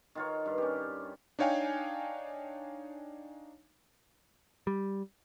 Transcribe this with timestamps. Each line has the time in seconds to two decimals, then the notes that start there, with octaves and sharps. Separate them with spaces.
0.15 D#3 F4 C#5
0.46 G2
0.58 C#4 G4
1.39 D4 D#4 C#5 F5 G5 G#5
4.67 G3